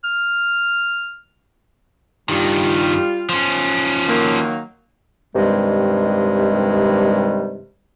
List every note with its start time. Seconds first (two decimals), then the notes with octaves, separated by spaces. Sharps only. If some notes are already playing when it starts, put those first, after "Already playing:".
0.04 F6
2.29 G2 D#3 G3 F4
3.29 F3 C#4
4.08 D#3 F#3 A#3
5.35 G2 C3 D#3 G3 G#3